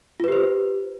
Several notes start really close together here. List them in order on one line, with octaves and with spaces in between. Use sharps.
F4 B4 G4 C5